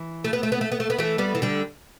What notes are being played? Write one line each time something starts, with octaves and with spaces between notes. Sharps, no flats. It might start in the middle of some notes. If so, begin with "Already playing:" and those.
Already playing: E3
A3
B3
A3
B3
A3
B3
A3
B3
E3 A3
G3 B3
E3
D3 G3